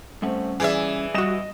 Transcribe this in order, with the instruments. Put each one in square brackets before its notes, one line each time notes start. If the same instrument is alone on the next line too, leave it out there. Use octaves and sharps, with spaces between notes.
[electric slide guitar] G3 C#4 F#5 [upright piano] A3 C4
[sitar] E3 E5 [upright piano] G#4 D5
[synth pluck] G3 F#4 [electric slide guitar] D#5 [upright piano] D#6 E7